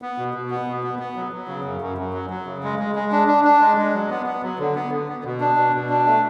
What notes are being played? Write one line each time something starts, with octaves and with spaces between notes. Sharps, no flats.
B3
B2
B2
B3
B2
B3
B3
F#3
F#3
C#3
F#2
F#2
F#2
F#3
F#3
C#3
G#3
G#3
G#3
D4
D4
D4
G#3
G#3
F#3
B3
B3
F#3
D3
B3
D3
B3
B2
D4
B2
B2
D4
A3